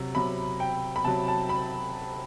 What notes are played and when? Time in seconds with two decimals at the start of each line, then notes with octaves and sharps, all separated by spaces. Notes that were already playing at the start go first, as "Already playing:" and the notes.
Already playing: C3 F#3
0.15 C3 F#3 B5
0.60 G5
0.96 B5
1.04 C3 F#3 A5
1.28 A5
1.49 B5